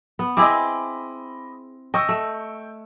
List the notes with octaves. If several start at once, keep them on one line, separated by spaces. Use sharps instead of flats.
B3
C4 E4 G#4 D#5 B5 D6
D#5 G5 C#6 E6
A3